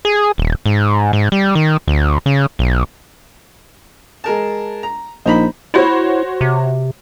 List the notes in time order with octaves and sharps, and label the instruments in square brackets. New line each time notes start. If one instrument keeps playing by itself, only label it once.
[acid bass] G#4
D#1
G#2
G#2
G3
D#3
D2
C#3
B1
[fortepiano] G#3 A#4 A5
A#5
[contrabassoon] A#1 [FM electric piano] D#4 D#5 [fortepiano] C5 A#5 B5
[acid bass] E4 [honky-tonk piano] F#4 C5 C#5
[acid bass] C3